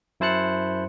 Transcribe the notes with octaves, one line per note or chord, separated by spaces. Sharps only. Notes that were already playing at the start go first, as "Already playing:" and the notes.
F#2 E4 C5 A5 F#6 C#7